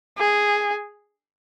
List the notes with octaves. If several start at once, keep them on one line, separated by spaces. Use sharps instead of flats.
G#4